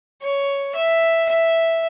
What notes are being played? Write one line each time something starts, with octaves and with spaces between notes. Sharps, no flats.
C#5
E5
E5